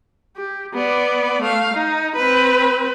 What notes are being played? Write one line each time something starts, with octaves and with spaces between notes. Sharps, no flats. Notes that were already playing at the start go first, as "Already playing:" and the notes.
G4
B3 D5
A3 F5
D#4
C4 B4